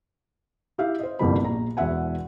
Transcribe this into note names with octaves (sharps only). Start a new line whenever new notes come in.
E4 G4 E5 F5
C5 D#5
G1 C2 F2 G3 A#3 B5
A#1 A#5
E1 E2 F#4 E5 F#5 G#5